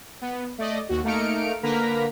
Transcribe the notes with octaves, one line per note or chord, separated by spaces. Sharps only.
B3
A3 D5 D#5
D#2 F#4
A3 A#3 D#4 F6 C#7 D7
D3 A#3 A#4 B4 A#5 B6